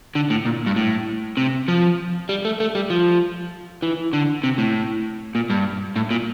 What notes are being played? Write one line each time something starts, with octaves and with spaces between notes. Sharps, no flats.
D3
A2
A#2
G2
A2
C3
F3
G3
A3
A3
G3
F3
E3
D3
C3
A2
A#2
G2
A2
A#2